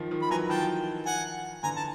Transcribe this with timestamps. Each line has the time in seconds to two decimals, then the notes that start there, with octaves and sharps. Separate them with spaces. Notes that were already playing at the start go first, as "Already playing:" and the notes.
Already playing: D#3 F3
0.11 D#3 F3
0.22 B5
0.31 E3 F#3 G#5 A#5
0.50 D#3 F3 G5 A5
1.06 F#5 G#5
1.63 D3 E3 G#5 A#5
1.76 A5